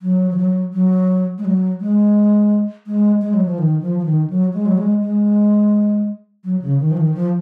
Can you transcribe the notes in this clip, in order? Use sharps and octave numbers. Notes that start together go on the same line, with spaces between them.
F#3
F3
F#3
F#3
G#3
F#3
G#3
G#3
G#3
F#3
F3
D#3
F3
F3
D#3
F#3
G#3
F#3
G#3
G#3
F#3
C#3
D#3
F3
D#3
F3